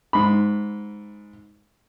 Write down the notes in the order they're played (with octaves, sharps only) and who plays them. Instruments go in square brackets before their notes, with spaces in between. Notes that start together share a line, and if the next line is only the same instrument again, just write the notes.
[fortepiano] G#2 B5